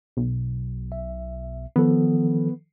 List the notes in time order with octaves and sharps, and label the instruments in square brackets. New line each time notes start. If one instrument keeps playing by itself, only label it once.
[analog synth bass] B1
[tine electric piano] E5
[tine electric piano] D#3 F3 A4 [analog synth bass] B3